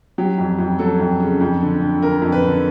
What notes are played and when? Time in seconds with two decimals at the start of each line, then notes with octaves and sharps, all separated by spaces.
0.18 F#3 G4
0.38 F2
0.59 F2
0.79 F#3 A4
0.99 F2
1.20 C#3
1.41 F2
1.61 D3
1.81 D3
2.02 D3 A#4
2.22 F2
2.32 B4
2.43 D3